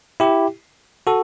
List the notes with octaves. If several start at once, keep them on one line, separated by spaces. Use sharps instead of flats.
E4 G4
F#4 A4